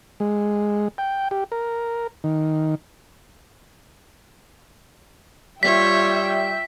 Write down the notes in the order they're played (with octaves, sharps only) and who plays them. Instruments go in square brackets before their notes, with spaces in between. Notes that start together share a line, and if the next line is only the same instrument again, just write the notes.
[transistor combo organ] G#3
G5
G4
A#4
D#3
[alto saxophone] G3 [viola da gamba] F4 C#5 [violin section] E5 G5 [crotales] B6